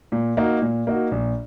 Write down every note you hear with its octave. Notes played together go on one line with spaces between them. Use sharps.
A#2
A#3 D#4 F#4
A#2
A#3 D#4 F#4
A#1